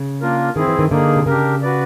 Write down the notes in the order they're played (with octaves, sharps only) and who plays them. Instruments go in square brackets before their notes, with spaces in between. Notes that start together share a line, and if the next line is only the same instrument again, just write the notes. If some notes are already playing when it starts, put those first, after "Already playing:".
Already playing: [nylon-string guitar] C#3
[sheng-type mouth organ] A#3 D4 F4 A#4
[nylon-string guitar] D#3 [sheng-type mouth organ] C4 E4 G#4
[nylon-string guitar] E3
D#3
[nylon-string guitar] D3 [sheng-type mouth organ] A#3 D#4 G#4
[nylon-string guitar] C3
[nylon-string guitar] C#3 [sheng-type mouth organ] D4 G4 A#4
[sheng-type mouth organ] F#4 B4 D5